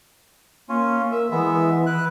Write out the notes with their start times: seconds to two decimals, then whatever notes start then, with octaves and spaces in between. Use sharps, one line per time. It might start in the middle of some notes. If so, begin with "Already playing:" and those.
0.69 A#3 C#4 F4
1.12 A#4 E5
1.31 E3 G#3 B3 E5
1.86 E4 B4 F#6